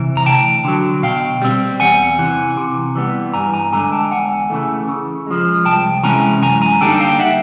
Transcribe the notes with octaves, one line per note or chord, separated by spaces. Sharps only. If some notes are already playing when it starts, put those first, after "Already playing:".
Already playing: C3 E3
A#5
D2 G5 A5
D3 F#3
B2 F5 G5
G3 C4
E2 F#5 G#5
C3 E3
C3
E3 G3 B3
G2 G#5 A#5
G#5 A#5
D3 F3 G#3 G#5 A#5
G5 A5
E2 F#5 G#5
C#3 E3 A3
C#3
F3 G#3
C2 G5 A5
C3 E3 G#3 C#4 G#5 A#5
F#2 G#5 A#5
G#5 A#5
D3 G3 A#3 D#4 G5 A5
F5 G5
E5 F#5